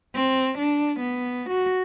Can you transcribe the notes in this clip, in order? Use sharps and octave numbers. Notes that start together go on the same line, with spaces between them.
C4
D4
B3
F#4